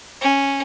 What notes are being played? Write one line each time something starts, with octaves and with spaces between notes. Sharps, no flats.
C#4